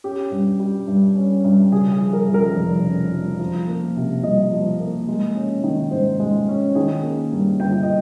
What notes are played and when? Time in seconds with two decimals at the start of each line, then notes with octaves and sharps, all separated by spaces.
0.04 C#4 G4
0.31 G2
0.60 G3
0.87 G2
1.15 C#4
1.44 G2
1.72 C#3 G#4
1.92 G#4
2.00 F3
2.13 A#4
2.28 F2
2.34 A#4
2.56 F1
2.84 C#3
3.12 F3
3.39 F3
3.67 A#3
3.96 C3
4.23 C2 D#5
4.52 F3
4.80 A#3
5.08 G#3
5.35 C#4
5.64 D#3
5.91 G#2 C5
6.20 G#3
6.48 C#4
6.75 D#3 G#4
7.03 A#3
7.32 G2
7.60 G1 G5
7.83 D#5